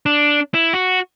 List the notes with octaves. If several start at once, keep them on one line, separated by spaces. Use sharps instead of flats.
D4
E4
F#4